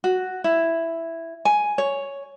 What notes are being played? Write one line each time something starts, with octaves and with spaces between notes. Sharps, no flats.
F#4
E4
G#5
C#5